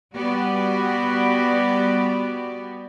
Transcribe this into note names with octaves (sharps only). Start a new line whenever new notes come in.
G3 B3 F#4 G4 D5